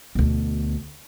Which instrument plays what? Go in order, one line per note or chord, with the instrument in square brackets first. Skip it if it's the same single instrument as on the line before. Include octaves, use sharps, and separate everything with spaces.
[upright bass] D2 B2